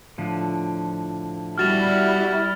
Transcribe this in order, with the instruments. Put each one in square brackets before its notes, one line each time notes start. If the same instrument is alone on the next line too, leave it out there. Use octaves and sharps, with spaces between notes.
[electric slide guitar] A2 D3 F3
[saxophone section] B2 F#4 [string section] G3 E4 [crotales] F6 A6 F7